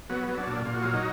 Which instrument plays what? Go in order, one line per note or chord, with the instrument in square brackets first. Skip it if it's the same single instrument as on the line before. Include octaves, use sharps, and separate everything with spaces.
[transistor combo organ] F#3 B3
F#3
D4
A#2
A#2 F4
F#4
F#3 F4
D#4